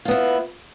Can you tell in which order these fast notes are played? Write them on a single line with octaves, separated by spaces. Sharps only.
F4 B3 E4